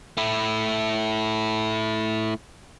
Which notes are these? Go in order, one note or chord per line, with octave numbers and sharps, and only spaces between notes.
A3 E4